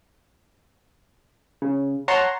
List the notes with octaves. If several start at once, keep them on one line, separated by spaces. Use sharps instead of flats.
C#3
C#5 F#5 A5 A#5 C6